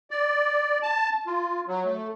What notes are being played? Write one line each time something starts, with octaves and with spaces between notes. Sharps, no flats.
D5
A5
F4
F#3
A3